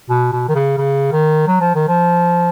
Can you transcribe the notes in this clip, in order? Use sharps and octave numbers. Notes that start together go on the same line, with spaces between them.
B2
B2
D#3
C#3
C#3
D#3
F#3
F3
D#3
F3